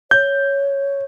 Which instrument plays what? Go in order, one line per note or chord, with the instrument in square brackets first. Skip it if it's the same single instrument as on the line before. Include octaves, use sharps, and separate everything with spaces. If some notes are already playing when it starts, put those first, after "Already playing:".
[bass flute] C#5 [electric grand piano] G6